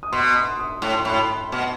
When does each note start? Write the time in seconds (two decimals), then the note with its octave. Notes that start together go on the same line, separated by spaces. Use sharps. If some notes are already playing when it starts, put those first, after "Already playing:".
0.03 D#6
0.12 B2 C6
0.36 D#6
0.59 D#6
0.82 A2 D#6
0.94 C6
1.05 A2 B5
1.19 C6
1.52 B2